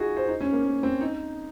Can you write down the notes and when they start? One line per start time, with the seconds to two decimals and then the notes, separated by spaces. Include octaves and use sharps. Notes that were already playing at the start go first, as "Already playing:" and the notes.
Already playing: D#4 F4 F#4 G#4
0.17 C5
0.28 D#4
0.41 C#4
0.53 A#3
0.65 A#3
0.83 C4
1.01 D#4